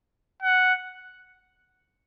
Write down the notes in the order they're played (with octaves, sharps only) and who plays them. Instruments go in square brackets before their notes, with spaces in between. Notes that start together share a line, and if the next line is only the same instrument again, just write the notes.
[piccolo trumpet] F#5